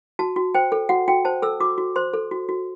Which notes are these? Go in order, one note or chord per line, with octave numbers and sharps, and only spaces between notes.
F#4 A5
F#4
C5 G5
A4
F#4 F#5
F#4 G5
C5 A5
A4 E6
F#4 D6
F#4
C5 C6
A4
F#4
F#4